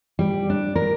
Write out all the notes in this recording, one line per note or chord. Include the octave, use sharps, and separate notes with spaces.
G3
D4
A#4